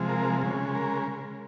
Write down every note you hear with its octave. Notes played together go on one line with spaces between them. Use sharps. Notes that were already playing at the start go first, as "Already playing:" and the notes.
Already playing: C3 F3 G#3
A#4
C#3 G#3
A#4